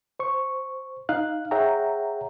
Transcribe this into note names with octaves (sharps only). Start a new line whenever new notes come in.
C5 C#6
D#4 F5 F#6
G#4 C#5 E5 F#5 G5 A#5